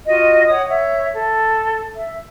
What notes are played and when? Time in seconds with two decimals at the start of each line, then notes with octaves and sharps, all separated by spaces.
0.07 F4 F#4 D#5
0.48 C#5 F#5 D#6
0.66 C#5 E5
1.14 A4
1.96 E5